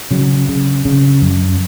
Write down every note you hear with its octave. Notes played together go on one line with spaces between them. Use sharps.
C#3 F#3
C#3
C#3
F#2